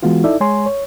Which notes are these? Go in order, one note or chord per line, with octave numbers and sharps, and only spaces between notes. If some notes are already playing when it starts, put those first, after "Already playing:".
E3 G#3 B3 F4 F#4
D#4 E4 A4 D5 E5
G#3 C#5 G#5 C6
C#5